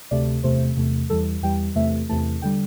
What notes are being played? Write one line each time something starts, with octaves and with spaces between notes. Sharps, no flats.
D2 C3 A3 D5
E2 C3 A3 C5
E2 C3 A3
E2 E3 G3 A4
E2 E3 G3 G5
E2 C3 E3 A3 E5
E2 C3 E3 A3 A5
D3 G3 G5